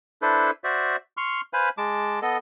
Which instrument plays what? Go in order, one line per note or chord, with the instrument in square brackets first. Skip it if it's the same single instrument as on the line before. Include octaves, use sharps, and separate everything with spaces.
[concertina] D4 E4 A4 B4 C5
F#4 C5 D5 E5
C6 C#6 F6
B4 C5 F5 G#5 B5
G#3 A5 D6
B3 A4 D#5